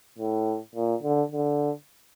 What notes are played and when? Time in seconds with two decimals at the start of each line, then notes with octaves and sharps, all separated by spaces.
0.19 A2
0.75 A#2
1.03 D3
1.31 D3